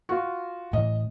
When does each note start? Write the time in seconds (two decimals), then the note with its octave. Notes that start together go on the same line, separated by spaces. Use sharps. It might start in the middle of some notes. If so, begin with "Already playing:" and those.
0.09 F4 F#4
0.73 A2 E3 D#5